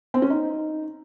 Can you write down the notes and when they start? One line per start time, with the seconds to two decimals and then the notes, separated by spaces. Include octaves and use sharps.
0.14 C4
0.22 C#4
0.30 D#4